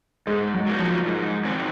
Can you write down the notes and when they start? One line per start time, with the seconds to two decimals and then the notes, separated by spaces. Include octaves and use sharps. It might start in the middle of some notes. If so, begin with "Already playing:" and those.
0.27 G#2 G#3
0.54 F#3
0.66 F#3 A#3 D#4 F#4
0.79 F3
1.06 G#2
1.45 D#3 F#3 C4